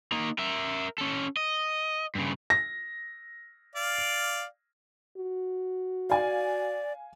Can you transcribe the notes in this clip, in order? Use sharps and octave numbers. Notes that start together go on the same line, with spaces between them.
A#3 D#4
A#4 E5
C#4 A4
D#5
G2 C#3
A#6
D5 F5
F#4
D5 F5 G#5